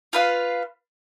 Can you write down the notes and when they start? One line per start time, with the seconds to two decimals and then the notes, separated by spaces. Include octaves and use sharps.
0.13 F4 B4 F5